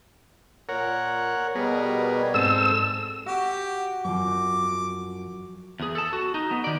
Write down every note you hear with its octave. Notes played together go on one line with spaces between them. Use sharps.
A#2 A#4 C#5 F#5
B2 G3 B3 G#4 A#4
G#2 C4 A4 E6
F#4 G4
F#2 F3 D6
E2 G#4
A4 A5
F#4
D#4
B3
D#3 D5